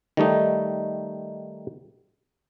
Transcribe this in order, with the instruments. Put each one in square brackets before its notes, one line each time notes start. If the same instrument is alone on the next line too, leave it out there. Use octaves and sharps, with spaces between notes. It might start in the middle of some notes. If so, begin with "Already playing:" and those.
[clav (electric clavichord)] D#3 G3 A3 D#4